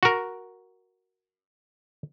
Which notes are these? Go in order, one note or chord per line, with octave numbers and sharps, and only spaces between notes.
F#4 A#4